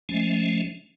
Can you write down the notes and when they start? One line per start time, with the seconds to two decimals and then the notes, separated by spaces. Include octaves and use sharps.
0.09 F3 G#3 A3 C#4